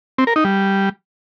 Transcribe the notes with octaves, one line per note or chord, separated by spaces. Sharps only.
C4
A#4
D#4
G3